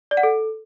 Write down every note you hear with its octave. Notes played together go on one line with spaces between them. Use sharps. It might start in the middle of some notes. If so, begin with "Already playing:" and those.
D5
F#5
A4